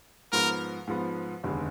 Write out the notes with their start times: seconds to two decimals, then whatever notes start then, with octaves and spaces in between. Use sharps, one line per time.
0.33 G#2 F3 B3 A#4
0.87 G#2 F3 B3
1.44 F1 D#2 D3 G#3 B3